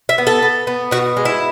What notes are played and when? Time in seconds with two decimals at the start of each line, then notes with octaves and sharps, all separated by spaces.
0.09 E5
0.18 B3
0.27 A4
0.43 B3
0.67 B3
0.91 B2 F#4
1.17 G#3
1.25 E4